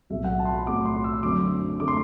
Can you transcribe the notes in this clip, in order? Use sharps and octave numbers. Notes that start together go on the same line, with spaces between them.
B1 A2 F#3 A3 C4 E5
F#5
A5
C6
B5
B1 A2 F#3 A3 C4 D6
C6
E6
F#2 D3 A3 C4 D6
D3 A3 C4 D6
C6